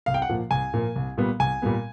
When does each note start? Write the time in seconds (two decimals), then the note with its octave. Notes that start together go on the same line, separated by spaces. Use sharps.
0.06 C2 F5
0.14 G5
0.22 F#5
0.29 A#2 F3 A#3
0.51 C2 G#5
0.74 A#2 F3 A#3
0.95 C2
1.18 A#2 G3 B3
1.40 C2 G#5
1.62 A#2 G3 B3